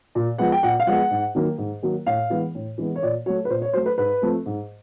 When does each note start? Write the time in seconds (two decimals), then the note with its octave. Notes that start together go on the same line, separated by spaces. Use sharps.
0.15 A#2
0.38 F3 G#3 B3 F#5
0.52 G5
0.63 A#2 F#5
0.80 F5
0.87 F3 G#3 B3 F#5
1.11 G#2
1.35 D#3 F#3 A#3
1.58 G#2
1.82 D#3 F#3 A#3
2.06 A2 F5
2.30 E3 G#3 B3
2.55 A2
2.78 E3 G#3 B3
2.96 C#5
3.03 A#2 D5
3.26 F#3 A3 C#5
3.45 B4
3.50 A#2 C5
3.62 C#5
3.73 F#3 A3 C5
3.86 B4
3.98 G#2 B4
4.22 F3 A3 C4
4.46 G#2